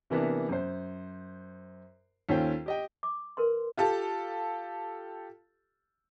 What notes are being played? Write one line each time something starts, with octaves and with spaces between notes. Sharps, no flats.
C3 E3 A#3 B3 D4
F#2 C5
D#2 C#4 F4 A4 C5 G5
G4 D#5 G5
D6
A#4 B4 C6
F4 G4 A4